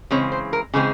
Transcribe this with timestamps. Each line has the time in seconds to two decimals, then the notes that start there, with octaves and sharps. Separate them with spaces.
0.11 C#3 E3 G#3 C4 C#5
0.32 C5
0.53 A#4
0.73 C#3 E3 G#3 C4 G#4